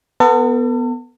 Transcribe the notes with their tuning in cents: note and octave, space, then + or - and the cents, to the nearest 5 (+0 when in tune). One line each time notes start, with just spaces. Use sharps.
B3 +0 A4 +40